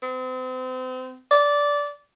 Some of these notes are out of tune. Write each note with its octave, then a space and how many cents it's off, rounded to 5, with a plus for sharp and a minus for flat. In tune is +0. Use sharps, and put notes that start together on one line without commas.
C4 -35
D5 -15